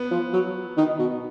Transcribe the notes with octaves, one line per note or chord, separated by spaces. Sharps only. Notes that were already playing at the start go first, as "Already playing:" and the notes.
Already playing: B3
F3
F#3
D#3
B2